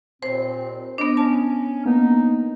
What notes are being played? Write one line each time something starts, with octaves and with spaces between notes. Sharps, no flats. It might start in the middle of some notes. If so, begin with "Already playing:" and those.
D#2 A#2 C4 C5
B3 D4 D#5
C#4 A5
A#3 B3 D#4